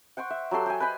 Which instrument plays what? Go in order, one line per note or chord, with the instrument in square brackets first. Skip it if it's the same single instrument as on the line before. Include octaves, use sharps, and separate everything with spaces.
[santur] F#5 G5 C6 C#6
E5
F#3 G4 A4 C6
G4 G#5
B4 D#5 G#5 B5